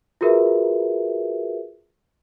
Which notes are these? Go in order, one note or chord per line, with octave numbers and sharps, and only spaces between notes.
F4 F#4 G#4 A#4 B4 E5